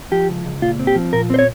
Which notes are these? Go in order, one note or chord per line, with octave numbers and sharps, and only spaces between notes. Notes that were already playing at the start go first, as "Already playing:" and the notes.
F3 G4
C#2
C#2
A#2 F4
C4
G4
F3
A#2 A#4
C4 C5
C#5